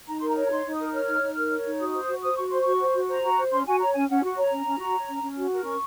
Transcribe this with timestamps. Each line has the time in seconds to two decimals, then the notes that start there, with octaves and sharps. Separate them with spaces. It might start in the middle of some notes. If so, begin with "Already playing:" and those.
0.08 D#4 A#5
0.19 A#4 C6
0.28 A#5
0.37 C#5
0.45 A#5
0.51 D#4 C6
0.66 D#4
0.73 D#6
0.80 A#4
0.94 C#5 F6
1.08 D#4
1.22 D#4
1.37 A#4
1.51 C#5
1.66 D#4
1.79 F#4 D#6
1.94 C5
2.09 F#4
2.22 C5 D#6
2.36 F#4 C#6
2.49 C5 C6
2.61 F#4 C#6
2.80 C5
2.95 F#4
3.08 C5 A#5
3.22 F#4
3.37 C5
3.51 C#4 C6
3.66 F#4 G#5
3.80 C#5 A#5
3.94 C#4 G#5
4.09 C#4 F#5
4.22 F#4
4.37 C#5 A#5
4.51 C#4
4.65 C#4
4.79 F#4
4.95 C#5
5.09 C#4
5.23 C#4
5.38 F#4
5.51 A#4
5.65 C#4 C#6